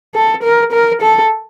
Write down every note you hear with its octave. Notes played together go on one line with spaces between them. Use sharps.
A4
A#4
A#4
A4